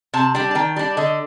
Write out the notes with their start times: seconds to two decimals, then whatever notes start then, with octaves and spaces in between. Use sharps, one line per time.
0.14 C3 A5
0.35 G3 D4 G5
0.51 A5
0.55 D#3 G5
0.76 G3 D4
0.97 D3 D#5